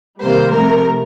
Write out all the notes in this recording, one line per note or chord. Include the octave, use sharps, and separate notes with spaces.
C3 D#3 G3 A#3 C5
C3 F3 A3 A#4